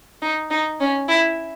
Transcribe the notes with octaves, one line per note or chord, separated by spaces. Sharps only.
D#4
D#4
C#4
E4